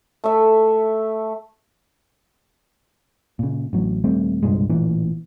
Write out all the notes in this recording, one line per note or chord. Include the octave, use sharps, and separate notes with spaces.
A3 E5
A#2 C#3
A1 F#3
D#1 G3 A3 C4
C2 G2 A#2 G#3
A1 A#2 E3